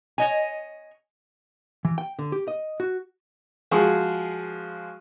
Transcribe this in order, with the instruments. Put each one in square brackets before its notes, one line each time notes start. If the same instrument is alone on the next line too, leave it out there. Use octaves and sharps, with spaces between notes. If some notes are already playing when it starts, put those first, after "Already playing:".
[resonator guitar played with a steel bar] C#5 D#5 G#5
[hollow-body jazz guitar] E3
G5
D3
G4
D#5
F#4
[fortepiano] F3 G#3 F#4 G#4